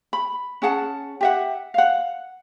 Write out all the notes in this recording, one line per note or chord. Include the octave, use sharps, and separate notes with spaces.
B5
C#4 G#4 F#5 A5
G4 E5 F#5
F5 F#5